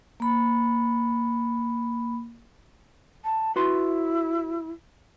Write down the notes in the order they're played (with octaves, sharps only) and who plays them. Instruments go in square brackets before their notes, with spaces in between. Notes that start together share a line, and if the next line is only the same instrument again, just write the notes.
[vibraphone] A#3 B5
[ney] A5
[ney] E4 [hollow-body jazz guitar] F#4 B4 C6